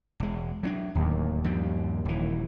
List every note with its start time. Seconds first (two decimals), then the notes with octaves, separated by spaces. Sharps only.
0.20 E1 G#3
0.63 F#3 C4 D4
0.95 D1 D#2
1.44 G2 F3 G3
2.05 D#1 E3